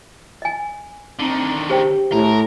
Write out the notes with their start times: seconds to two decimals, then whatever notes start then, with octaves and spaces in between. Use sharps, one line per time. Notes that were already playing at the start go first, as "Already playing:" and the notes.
0.42 D#5 G#5
1.20 D3 D#3 C4
1.70 G4 G#4 C5 G5
2.12 A2 A#4